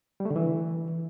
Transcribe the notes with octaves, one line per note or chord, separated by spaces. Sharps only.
G3
A3
D3
E3